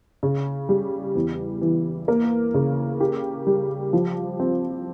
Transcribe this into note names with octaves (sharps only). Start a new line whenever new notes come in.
C#3
G3
E2
E3
A#3
C#3
G4
G3
F3
C4